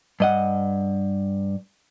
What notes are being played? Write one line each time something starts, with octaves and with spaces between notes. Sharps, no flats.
G2 D#5 F#5